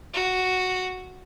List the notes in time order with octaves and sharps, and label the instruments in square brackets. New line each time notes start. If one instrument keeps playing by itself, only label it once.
[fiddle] F#4